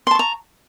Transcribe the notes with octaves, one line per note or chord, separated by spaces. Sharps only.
A5 A#5 C6 C#6